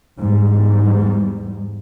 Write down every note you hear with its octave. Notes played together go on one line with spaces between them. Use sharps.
E2 G#2 G3